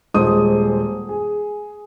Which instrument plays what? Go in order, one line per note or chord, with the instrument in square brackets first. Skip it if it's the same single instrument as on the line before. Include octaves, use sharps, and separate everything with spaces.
[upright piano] D#1 G#3 C5 D#6
G#4